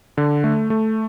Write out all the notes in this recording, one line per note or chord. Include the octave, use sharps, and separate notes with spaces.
D3
A3
A3